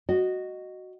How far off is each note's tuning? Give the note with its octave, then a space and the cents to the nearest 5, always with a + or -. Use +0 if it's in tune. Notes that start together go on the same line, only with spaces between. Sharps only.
F#4 +0 D#5 -10